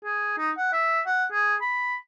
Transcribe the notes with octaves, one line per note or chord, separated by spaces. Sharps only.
G#4
D#4
F#5
E5
F#5
G#4
B5